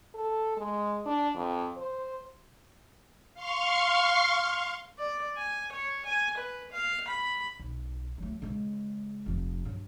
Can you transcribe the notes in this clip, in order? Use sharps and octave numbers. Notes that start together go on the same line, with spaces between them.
A4
G#3
D4
F2
C5
F5 C6 C#6 F6
D5
G#5
C#5
G#5
B4
F5
B5
B1
F#3 A3
C#3 G#3
F1 F3
G2 F#3